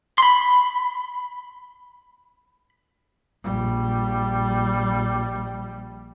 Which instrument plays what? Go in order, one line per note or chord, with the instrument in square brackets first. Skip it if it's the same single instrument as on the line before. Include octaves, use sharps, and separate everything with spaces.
[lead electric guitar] B5 C6
[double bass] A#1 G3